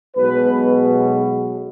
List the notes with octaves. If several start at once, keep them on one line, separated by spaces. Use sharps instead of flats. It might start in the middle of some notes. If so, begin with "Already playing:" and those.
B1 B2 G#3 B4